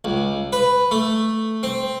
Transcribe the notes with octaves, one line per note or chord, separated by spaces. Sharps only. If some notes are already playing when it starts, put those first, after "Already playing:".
C#2
B4
A3
C4